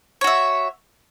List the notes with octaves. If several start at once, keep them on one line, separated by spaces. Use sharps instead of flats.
F#4 C#5 E5